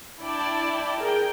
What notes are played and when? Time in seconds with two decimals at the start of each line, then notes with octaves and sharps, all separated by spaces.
0.20 D4 E4 D5 G5 A5
1.02 G#4 A#4 G5